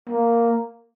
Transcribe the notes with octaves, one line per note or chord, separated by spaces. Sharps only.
A#3